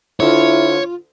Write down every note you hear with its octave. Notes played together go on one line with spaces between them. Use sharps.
D2 D3 E4 F4 C#5